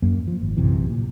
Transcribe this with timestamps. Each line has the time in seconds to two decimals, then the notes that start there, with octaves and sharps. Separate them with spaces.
0.02 F#2 F#3 A#3
0.27 F3
0.41 G#1
0.57 A#1 F#2 C3 E3
0.89 A#2